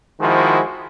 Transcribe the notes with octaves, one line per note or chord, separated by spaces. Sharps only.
D#3 F3 G#3 E4 F#4 C5